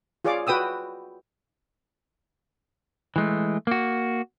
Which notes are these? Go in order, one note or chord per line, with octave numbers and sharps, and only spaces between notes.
F4 G#4 C#5 D5 F5 D6
F#4 B4 G5 D#6 E6
E3 G#3 A3
A#3 F#4